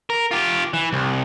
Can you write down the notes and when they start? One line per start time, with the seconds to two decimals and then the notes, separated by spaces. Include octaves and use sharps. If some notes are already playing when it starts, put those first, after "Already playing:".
0.10 A#4
0.31 F4 G4
0.74 E3
0.93 C2